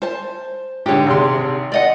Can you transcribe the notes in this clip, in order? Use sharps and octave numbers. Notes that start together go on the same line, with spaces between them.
C5 A5
G#2 D3 G4 C#5
G#1 C3 C6
D5 D#5 F#5